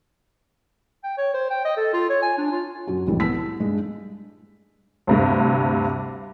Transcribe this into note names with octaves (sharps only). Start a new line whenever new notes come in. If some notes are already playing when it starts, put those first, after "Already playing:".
G5
C#5
C5
G5
D#5
A4
F4
C#5
G#5
D4
F4
F#2 F#4
C2 F2 A2 E3 G#3
B3 E4 A5 E6 B6
E4
G2 G#3
D2 G2 C3